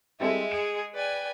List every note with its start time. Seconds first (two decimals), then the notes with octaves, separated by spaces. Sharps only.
0.20 G3 G#3 C4 E4 A4 E5
0.51 G#4 C#7 D7 E7
0.95 B4 D5 G5 G#5